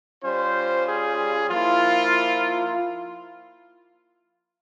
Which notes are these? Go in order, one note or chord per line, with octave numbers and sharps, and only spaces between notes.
G3 C#4 F4 C5
G#4
F3 A#3 E4 F4